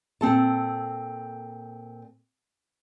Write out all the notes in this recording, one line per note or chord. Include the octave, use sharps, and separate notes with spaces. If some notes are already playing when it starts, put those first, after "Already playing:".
A#2 C4 A4 A5